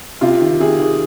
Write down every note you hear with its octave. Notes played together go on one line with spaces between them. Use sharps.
C3 F4
D#3
C3 G#4
D#3